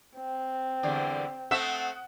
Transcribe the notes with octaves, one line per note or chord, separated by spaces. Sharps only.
C4
E2 D3 G3
A3 C4 E5 F#5 D#6